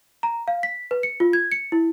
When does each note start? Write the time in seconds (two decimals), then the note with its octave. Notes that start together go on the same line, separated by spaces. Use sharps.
0.23 A#5
0.48 F5
0.63 B6
0.91 B4
1.03 C#7
1.20 F4
1.33 G#6
1.52 C#7
1.72 E4